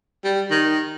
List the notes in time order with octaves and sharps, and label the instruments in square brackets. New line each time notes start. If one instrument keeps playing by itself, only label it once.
[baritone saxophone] G3
D#3